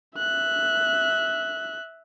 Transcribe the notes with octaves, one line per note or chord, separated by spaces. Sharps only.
E5 F#6